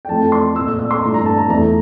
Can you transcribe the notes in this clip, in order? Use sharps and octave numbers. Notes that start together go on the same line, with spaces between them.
G5
F2 E3 A3 A5
C6
A#2 A3 E6
E6
E6
C6
G2 E3 A3 A#5
A#5
A5
A#5
E2 E3 A3 A#5